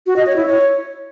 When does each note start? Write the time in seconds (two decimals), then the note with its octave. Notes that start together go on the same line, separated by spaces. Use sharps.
0.06 F#4
0.16 D#5
0.26 C#5
0.36 E4
0.46 C#5